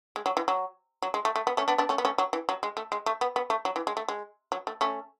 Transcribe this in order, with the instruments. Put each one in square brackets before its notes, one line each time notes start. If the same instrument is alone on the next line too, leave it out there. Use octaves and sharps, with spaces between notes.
[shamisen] G#3
F#3
E3
F#3
F#3
G#3
A3
A3
B3
A3 C#4
B3 D4
B3 D4
A3 C#4
B3
A3 C#4
F#3
E3
F#3
G#3
A3
G#3
A3
B3
B3
A3
F#3
E3
G#3
A3
G#3
F#3
A3
A3 C#4